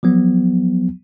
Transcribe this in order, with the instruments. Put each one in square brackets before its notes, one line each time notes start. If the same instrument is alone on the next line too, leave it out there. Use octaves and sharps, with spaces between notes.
[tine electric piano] F3 F#3 B3